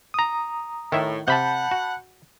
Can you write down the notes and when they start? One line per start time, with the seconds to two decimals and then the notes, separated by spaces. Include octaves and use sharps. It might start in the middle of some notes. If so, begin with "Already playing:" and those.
0.14 A#5 D#6
0.92 A2 D#3 E4 E5
1.28 C3 F#5 A5 B5 G6
1.71 F#4